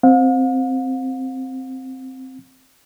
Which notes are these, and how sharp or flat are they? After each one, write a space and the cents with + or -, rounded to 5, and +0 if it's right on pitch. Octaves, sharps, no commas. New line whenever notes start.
C4 +0 F5 +45